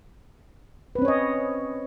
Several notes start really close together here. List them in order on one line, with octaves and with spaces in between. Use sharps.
B4 C4 C#4 C#5 D#5